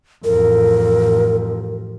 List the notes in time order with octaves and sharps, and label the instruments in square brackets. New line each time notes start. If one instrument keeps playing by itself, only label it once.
[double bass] A1 F2 [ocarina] A#4